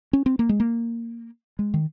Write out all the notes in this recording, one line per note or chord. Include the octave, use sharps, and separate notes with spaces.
C#4
C4
A#3
G#3
A#3
G#3
D#3